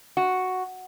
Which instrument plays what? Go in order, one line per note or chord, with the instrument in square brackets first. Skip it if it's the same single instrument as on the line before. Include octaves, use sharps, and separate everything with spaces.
[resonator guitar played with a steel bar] F#4